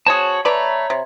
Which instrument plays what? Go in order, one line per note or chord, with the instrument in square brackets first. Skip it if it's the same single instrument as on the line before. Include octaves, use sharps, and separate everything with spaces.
[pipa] C4 G#4 [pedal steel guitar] F#4 C#5 A5
[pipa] A3 B4 D5 [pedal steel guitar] C#5 A#5 B5
[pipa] C3